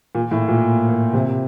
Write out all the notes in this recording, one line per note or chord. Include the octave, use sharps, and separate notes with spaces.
A#2
A2
A#2
A#2
C3